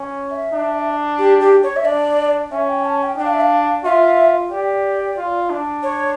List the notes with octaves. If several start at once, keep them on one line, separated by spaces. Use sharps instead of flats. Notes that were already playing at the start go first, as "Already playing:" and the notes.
Already playing: C#4
E5
D4
G4
G4
C#5
E5
D4 D5
C#4 E5
G5
A5
G5
D4 G5
F5
E5
F5
F4 E5
G4 D5
F4
D4
C#5